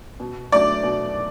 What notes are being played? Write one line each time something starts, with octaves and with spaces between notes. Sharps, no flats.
B2
F#3 A3 D4 D5
B2